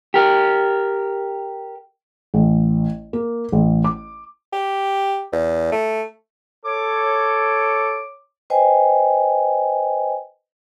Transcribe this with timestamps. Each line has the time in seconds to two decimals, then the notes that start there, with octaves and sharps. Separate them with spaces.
0.14 G4 A#4
2.34 A1
3.13 A#3
3.52 A1
3.84 D6
4.53 G4
5.33 E2
5.72 A3
6.65 A4 C#5 D6
8.50 B4 C5 D#5 G5 G#5